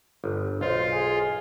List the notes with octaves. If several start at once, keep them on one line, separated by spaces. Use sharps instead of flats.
G1
B1 F4 C5
G#4